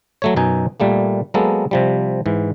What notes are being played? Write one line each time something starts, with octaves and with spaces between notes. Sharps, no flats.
F#3 A3 C#5
F#2 B2 D#4 G#5
A#2 G3 A3 A#3
F#3 G#3 A#3 B3 A4
C3 F3 G3
G#2 E3